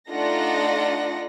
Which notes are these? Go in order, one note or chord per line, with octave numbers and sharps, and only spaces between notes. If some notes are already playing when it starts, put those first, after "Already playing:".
A3 D4 D#4 F4 F#5 A#6